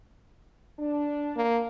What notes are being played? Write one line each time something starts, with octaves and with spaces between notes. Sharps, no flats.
D4
A#3